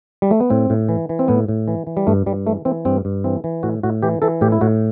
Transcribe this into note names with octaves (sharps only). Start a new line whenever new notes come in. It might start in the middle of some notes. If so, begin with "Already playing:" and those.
G3
A3
B3
A2 C4
A2
E3
E3
C4
A2 B3
A2
E3
E3
G3
G2 A3
G2 G3
E3 A3
E3 C4
G2 C4
G2
E3 C4
E3
A2 F#4
A2 F#4
E3 G4
E3 A4
A2 G4
E4
A2 F#4